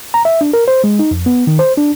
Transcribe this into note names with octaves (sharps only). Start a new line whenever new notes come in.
A#5
E5
D4
A#4
C5
G#3
D#4
F2
B3
D#3
C5
D4